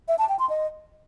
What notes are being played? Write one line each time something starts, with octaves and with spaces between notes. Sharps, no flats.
E5
A5
G5
C6
D#5